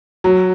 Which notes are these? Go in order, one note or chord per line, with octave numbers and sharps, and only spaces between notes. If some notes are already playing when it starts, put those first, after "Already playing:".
F#3